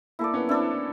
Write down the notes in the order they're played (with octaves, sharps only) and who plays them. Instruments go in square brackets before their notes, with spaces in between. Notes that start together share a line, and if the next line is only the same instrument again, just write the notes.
[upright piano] A#3 [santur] E4 A4 D5
[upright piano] B3 C#4
[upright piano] C4 D4 [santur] E4 A4 D5